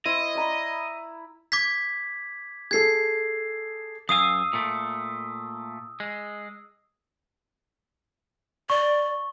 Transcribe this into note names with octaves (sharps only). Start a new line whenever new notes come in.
E4 C5 D#5
D5 A#5 B5
D6 G#6 B6
G#4 A4 G#6 C7
F#2 F5 G#5 D#6 E6
A#2 A3
G#3
D5 C#6